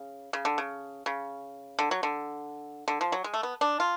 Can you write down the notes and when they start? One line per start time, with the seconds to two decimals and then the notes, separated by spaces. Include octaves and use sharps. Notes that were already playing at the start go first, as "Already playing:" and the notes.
Already playing: C#3
0.33 C#3
0.45 D3
0.58 C#3
1.06 C#3
1.79 D3
1.91 F#3
2.03 D3
2.88 D3
3.01 F3
3.12 F#3
3.24 G#3
3.34 A3
3.43 B3
3.61 D4
3.80 F4